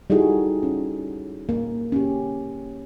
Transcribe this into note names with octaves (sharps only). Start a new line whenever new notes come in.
G3 D#4 E4 F#4 G#4 A4
C#4
A#3
C#4 G4